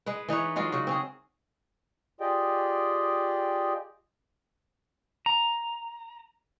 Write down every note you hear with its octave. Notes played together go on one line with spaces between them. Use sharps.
G#3 B4
E3 D#4 B4 C#5
F#3 G#3 F4 F#4
C#3 F#4
C4 C#4 G#4
F4 G4 G#4 D5 D#5 G5
A#5